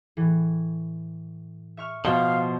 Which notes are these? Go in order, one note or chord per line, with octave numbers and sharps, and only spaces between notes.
A2 E3
E5 C#6 F6
B2 F3 F5